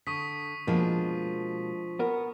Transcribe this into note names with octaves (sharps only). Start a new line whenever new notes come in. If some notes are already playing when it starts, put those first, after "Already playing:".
D3 C#6 D#6 B6
B2 F3 G#3 A#3 D4
B3 A#4